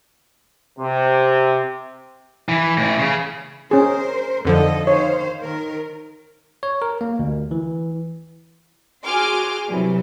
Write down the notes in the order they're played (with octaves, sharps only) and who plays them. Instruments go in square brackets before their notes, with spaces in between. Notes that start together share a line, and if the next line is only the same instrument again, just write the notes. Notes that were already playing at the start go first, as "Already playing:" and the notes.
[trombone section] C3
[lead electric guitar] E3
A2 E3
C#3
[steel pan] C#4 G#4 [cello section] A#4 C5
[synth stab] F2 D3 F3 [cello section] D#3 A4 D#5
[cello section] D#3 C5 F5 [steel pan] C#5
[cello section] D#3 A#4
[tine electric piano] C#5
A#4
A#3
D2
E3
[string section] F#4 G#4 G#5 C6 D6 F6
C3 E3 F#3 G3 E4